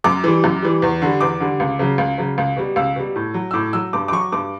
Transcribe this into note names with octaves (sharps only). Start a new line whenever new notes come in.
F#2 D6
E3 G3
F#2
E3 G3
E2
D3 G3
E2 D6
D3 G3
C#2
C#3 F#3
C#2
C#3 F#3
C#2
B2 G3
C#2 E6
B2 G3
A2
F#3
E6
A2 D6
F#3 E6
G2 D6
D6
F#3 C#6
G2 D6